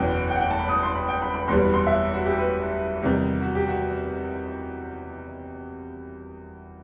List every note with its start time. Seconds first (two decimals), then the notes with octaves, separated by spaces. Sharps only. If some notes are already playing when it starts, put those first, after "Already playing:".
Already playing: F#1 E2 B2 G5
0.30 G5
0.36 F#5
0.41 G5
0.50 A5
0.59 B5
0.69 D#6
0.83 C6
0.96 B5
1.09 G5
1.22 B5
1.34 B5
1.48 F#1 E2 B2 G3 C6
1.60 B5
1.74 C6
1.87 E5
2.14 F#4
2.25 G4
2.39 B4
3.02 E2 C3 D#3 G3
3.41 F#4
3.55 G4
3.68 F#4